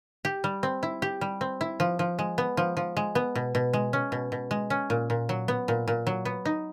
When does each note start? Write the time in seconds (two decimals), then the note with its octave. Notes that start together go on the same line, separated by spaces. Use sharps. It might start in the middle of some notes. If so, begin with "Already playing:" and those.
0.25 G4
0.44 G3
0.63 C4
0.83 E4
1.02 G4
1.21 G3
1.41 C4
1.61 E4
1.80 F3
1.99 F3
2.19 G#3
2.38 B3
2.57 F3
2.77 F3
2.97 G#3
3.15 B3
3.35 B2
3.55 B2
3.73 G#3
3.93 C#4
4.12 B2
4.32 B2
4.51 G#3
4.70 C#4
4.90 A#2
5.10 A#2
5.29 F#3
5.48 B3
5.68 A#2
5.88 A#2
6.07 F#3
6.25 B3
6.45 D#4